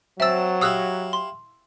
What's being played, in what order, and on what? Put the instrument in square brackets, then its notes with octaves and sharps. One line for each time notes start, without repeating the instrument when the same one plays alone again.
[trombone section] F#3 [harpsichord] C4 A5 [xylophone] E5 E6
[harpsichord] E4 G4 F5 [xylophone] D#6 E6 F#6
[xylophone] C6